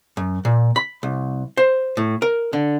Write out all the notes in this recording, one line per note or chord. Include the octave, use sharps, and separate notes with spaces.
F#2
A#2
B5
C2
C5
A2
A#4
D3